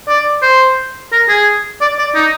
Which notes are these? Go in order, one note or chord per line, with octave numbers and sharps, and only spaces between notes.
D5
C5
A#4
G#4
D5
D5
D#4